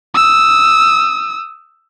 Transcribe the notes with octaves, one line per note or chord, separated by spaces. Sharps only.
D#6 E6